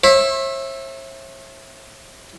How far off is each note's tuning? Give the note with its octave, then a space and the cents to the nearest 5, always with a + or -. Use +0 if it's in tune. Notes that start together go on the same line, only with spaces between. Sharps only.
C#5 -45 E5 +0